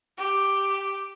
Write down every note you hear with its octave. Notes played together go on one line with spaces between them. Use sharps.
G4